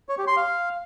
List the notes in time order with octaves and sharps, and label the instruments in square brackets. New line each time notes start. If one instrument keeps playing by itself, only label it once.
[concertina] C#5
G4
C6
F5